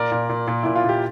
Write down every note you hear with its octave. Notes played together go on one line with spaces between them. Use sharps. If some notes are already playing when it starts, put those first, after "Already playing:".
Already playing: A#2 A#4 D5
A#2
A#2
A#2
A#2 E4
F4
A#2 G4